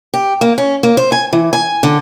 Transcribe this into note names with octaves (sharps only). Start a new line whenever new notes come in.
G4
A#3
C#4
A#3
C5
G#5
E3
G#5
D3